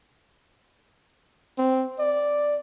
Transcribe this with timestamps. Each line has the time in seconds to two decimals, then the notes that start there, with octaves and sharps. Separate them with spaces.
1.58 C4
1.99 D5